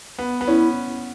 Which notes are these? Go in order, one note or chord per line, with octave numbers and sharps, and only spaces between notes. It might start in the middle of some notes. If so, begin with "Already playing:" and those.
B3
B3
C#4 E4